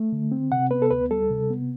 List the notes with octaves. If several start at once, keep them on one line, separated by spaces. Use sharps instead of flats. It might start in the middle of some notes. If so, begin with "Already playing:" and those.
Already playing: A3
D3
C4
C3 F#5
B3 B4
A4
D2 B4
G3 A4
C3
B3